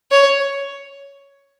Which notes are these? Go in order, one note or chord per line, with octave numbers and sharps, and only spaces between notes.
C#5